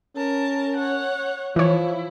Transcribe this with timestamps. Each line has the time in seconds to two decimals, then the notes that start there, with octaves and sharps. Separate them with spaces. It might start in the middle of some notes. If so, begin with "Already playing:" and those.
0.16 C#4 A#4 A5
0.76 C#5 F#5
1.56 E3 F3 E4 C#5